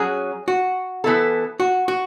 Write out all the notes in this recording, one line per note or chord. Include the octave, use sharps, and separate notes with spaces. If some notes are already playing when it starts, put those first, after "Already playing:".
Already playing: F#3 C#4 F#4 G#4
F#4
E3 B3 E4 A4
F#4
F#4